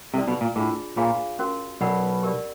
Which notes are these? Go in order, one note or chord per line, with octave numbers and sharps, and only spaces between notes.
C2 C3 E4 A4 D5
B1 B2
A#2
A2 D4 F4 G#4
A#2 F4 G#4 C#5 F5 G#5
C#4 F#4 A#4
B1 B2 A#4 D5 F#5 B5
G4 A#4 D5